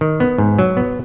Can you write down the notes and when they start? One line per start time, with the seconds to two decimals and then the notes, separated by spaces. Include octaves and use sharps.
0.01 D#3
0.20 B3
0.38 G#2
0.59 F#3
0.77 B3